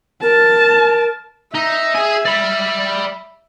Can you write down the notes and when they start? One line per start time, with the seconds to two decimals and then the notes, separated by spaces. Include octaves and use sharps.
0.22 A#4 A5
1.55 D#4 E5
1.95 G#4 G#5
2.25 D5 B5